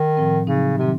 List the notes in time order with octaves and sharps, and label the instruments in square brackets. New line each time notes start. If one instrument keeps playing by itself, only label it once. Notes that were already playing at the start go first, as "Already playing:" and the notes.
Already playing: [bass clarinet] D#3
[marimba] A2 F3 C4
[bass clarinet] C#3 [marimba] F#3 C4 D#4
[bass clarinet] C3 [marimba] D#3 F#3 C4